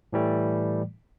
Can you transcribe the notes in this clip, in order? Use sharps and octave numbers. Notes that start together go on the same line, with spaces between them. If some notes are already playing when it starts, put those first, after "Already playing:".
A2 E3 G3 A3